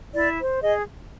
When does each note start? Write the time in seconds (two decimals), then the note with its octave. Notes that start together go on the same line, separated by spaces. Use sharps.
0.15 E4 D5
0.39 C5
0.62 G#4 D#5